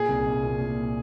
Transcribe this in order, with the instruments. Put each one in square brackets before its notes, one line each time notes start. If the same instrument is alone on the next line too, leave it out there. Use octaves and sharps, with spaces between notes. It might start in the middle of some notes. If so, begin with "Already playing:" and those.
Already playing: [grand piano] A#2 G#4
C2
C2
A#2
A#2